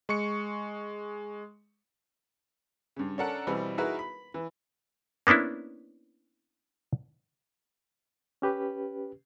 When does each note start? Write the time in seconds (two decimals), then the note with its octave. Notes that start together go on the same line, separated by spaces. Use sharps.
0.09 G#3 C#6 C#7
2.96 G2 C#3
3.18 C#4 D4 A4 A#4 F#5
3.47 B2 E3 G3 C4
3.78 D#4 E4 F#4 G#4 A#4 B4
3.99 B5
4.34 E3
5.27 A#3 B3 C#4 D4 E4
8.42 C#4 G4 B4